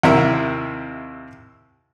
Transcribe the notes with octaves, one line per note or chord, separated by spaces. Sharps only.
D#2 C3 E4 A#4